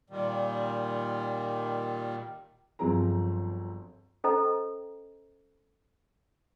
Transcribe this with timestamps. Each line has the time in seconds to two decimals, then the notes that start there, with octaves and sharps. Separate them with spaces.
0.10 A#2 D#3 G3
2.79 G1 F3 F#3 C4 G#4 A#5
4.24 C#4 A4 C5 D#5 A#5